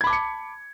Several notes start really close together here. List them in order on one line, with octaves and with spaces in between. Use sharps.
G#6 B5 D6 A5 C#7